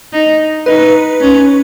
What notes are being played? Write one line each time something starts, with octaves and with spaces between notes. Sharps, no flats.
D#4
D#4 B4
C#4